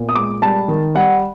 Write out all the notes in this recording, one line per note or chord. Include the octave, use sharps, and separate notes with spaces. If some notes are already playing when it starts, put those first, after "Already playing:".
Already playing: A#2 B3
D#6
G#3 D6
G3 A5
D#3
G3 F#5